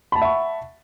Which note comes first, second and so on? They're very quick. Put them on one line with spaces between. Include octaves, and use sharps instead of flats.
B5 A5 F#5 E5 C#6